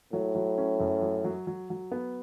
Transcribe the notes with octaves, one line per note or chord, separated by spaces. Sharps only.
A2 F#3
F#3
C#4
F#2
F#3
F#3
F#3
F#3
B3